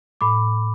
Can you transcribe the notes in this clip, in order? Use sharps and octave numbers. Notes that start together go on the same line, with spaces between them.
A2 B5 D6